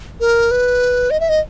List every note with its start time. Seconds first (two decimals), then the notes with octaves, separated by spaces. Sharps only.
0.20 A#4
0.51 B4
1.10 D#5
1.20 E5
1.29 D#5